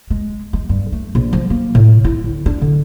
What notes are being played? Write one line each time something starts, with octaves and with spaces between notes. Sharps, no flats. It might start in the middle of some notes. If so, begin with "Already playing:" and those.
G#3
G#3
G2
A3
A#1
F3
A#3
A2
E4
D2
D4
D3